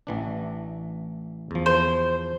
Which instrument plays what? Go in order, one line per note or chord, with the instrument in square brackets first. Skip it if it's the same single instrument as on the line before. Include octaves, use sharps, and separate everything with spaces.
[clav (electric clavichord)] A1 E3 D4
E2 F3
[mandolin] C5